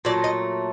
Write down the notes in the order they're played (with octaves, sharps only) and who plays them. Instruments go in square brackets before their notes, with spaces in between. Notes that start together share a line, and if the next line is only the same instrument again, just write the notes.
[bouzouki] A#2 F#3 A3 D5
D#5